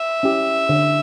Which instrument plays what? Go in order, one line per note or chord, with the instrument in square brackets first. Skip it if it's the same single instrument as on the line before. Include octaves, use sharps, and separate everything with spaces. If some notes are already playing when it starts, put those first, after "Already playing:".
Already playing: [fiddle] E5
[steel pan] C#4 E4 G4
D3